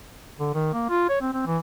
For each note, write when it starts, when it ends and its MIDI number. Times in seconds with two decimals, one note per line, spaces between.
0.40 0.50 50
0.54 0.73 51
0.73 0.88 58
0.89 1.07 65
1.09 1.17 73
1.21 1.31 60
1.33 1.44 60
1.47 1.58 52